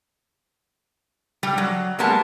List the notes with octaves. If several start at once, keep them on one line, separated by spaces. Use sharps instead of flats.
G3
F#3
G3 G#3 A#3 B3 A5